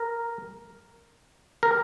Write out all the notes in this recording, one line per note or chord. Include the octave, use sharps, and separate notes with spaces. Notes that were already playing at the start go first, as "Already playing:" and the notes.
Already playing: A#4
A#4